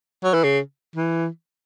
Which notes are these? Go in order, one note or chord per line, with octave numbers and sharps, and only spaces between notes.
F#3
E3
C#3
E3